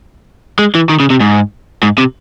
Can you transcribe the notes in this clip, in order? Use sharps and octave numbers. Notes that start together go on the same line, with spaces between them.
G#3
E3
D#3
C#3
C3
G#2
G#2
C3